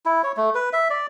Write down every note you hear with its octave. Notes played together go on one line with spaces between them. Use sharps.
E4
C#5
A3
B4
E5
D5